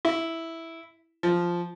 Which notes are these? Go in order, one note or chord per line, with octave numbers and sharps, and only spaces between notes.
E4
F3